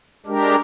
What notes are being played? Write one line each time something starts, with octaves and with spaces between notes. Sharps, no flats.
G#3 D4 G4 A#4